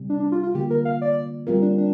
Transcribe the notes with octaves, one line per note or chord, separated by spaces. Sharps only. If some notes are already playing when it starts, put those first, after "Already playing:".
Already playing: C3 G3 C4
D4
D4
F4
F4
D3 A#3 F4 G4
A#4
F5
D5
G3 C4 F4 A#4
D4
D4